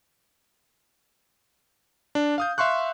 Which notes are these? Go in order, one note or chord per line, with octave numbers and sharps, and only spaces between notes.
D4
F5 D#6 G6
E5 F5 C6 C#6 F#6